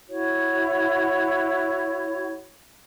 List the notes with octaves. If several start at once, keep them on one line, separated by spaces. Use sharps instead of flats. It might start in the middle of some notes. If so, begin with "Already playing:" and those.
E4 F#4 C#5